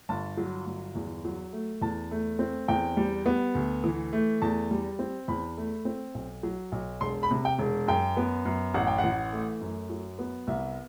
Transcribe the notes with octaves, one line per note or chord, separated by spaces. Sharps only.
G1 A5
F#3
G1
E2
F#3
A3
E2 A5
A3
C4
E2 G5
G3
B3
D2
E3
A3
E2 A5
G3
C4
E2 B5
A3
C4
B1
F#3
B1
E1 C6
B5
C3
G5
E1
F#2 G5
B3
F#2
A1 F#5
G5
F#5
E3
A3
F#2
F#3
B3
C2 E5